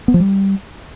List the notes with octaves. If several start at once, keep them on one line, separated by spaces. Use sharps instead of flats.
B3
F3
G3